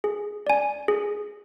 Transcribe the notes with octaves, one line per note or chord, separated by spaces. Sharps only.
G#4
D5 G#5
G#4